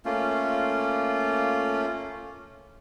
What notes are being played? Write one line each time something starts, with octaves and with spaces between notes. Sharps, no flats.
A3 A#3 C#4 F4